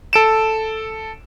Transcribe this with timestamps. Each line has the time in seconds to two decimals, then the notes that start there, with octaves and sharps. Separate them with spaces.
0.13 A4 D7 E7